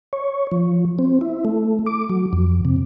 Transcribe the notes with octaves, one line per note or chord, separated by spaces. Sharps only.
C#5
F3
C4
E4
A3
D6
F#3
F2
C3